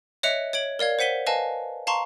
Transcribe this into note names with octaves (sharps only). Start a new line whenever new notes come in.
C#5 D#5 E5 F#6 C#7 F7
C#5 G#6 D7 F#7
A#4 D5 F5 G#6
C5 F#5 B6 D#7 G7
B4 D#5 F5 G#5 A5
F5 A5 A#5 C6 C#6